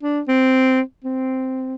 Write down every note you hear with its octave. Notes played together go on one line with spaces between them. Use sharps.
D4
C4
C4